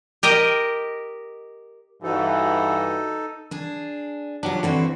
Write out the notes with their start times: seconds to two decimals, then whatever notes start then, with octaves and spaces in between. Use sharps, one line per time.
0.23 G4 A#4 D#5 G5
2.03 G2 E3 D#4 F#4 A4
3.51 D4 G#4
4.43 F#3 D4 F4 G4
4.63 D3 E3 C4 F#4